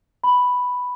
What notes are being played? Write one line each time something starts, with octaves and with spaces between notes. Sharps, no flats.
B5